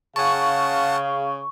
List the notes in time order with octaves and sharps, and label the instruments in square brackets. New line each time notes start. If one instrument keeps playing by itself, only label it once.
[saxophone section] C#3 [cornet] F5 [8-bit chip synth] F#5 A5 [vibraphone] C#6